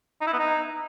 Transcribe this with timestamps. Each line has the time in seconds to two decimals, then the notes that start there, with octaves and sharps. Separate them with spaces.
0.21 D#4
0.27 E4
0.33 B3
0.39 D#4